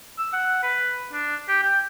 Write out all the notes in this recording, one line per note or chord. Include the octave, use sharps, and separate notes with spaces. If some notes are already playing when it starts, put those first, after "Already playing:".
E6
F#5
B4
D4
G4
G5